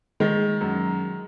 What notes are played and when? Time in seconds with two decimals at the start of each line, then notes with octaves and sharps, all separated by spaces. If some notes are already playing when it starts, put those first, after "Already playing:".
0.20 D#3 G#3
0.61 F#2